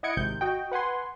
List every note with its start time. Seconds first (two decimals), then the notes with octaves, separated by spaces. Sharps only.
0.03 E4 D#5 F#5 G#6 C#7 D7
0.17 G#1 C3 G6
0.41 F#4 D#5 G5
0.72 B4 F#5 G#5 C6